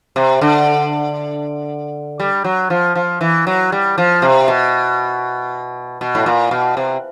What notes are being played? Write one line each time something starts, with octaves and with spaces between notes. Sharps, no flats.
C3
D3
G3
F#3
F3
F3
E3
F#3
G3
F3
C3
B2
B2
A2
A#2
B2
C3